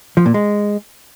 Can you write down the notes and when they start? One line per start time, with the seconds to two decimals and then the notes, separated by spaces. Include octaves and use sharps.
0.17 F3
0.26 A#2
0.34 G#3